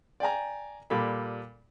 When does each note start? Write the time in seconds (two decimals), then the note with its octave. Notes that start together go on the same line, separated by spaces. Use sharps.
0.20 D5 G5 G#5 A#5
0.90 A#2 G3 A4 B5